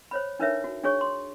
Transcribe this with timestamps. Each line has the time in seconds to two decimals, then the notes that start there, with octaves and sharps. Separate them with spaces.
0.11 C5 C#5 B5
0.39 D4 D#4 A#4 B4 C#5 E5
0.64 F#4
0.83 D4 G#4 C#5 C#6
1.01 C6